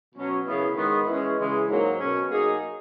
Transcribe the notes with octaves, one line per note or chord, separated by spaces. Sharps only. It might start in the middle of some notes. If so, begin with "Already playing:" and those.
B2 F#3 C#4
F#2 C#3 E3 B3
G#2 D#3 G#3 B3
E3 G#3 C#4
C#3 E3 G#3
G#2 F#3 A#3
B2 F#3 C#4
F#3 A#3 D#4 G#4